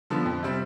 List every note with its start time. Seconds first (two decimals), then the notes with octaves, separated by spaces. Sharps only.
0.10 D3 F3 B3
0.26 F2
0.43 C3 G3 C4